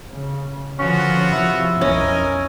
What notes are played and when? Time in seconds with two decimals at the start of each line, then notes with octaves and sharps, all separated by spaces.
0.10 C#3
0.79 D3 F3 B3 C#4 F4 F#4
1.32 C3 F3 E4
1.81 B1 F2 C#4 A#4 D#5 G#5